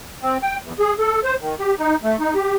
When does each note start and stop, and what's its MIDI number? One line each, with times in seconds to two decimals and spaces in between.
0.22 0.38 60
0.43 0.57 79
0.62 0.73 40
0.79 0.94 68
0.99 1.20 69
1.24 1.35 72
1.40 1.55 51
1.59 1.75 67
1.79 1.96 63
2.03 2.16 57
2.20 2.34 63
2.35 2.56 67